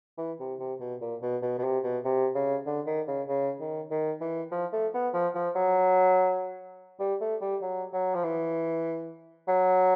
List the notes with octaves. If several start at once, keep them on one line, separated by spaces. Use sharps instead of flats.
E3
C3
C3
B2
A#2
B2
B2
B2
C3
B2
C3
C#3
D3
D#3
C#3
C#3
D#3
D#3
E3
F3
A3
B3
F3
F3
F#3
G3
A3
G3
F#3
F#3
F3
E3
F#3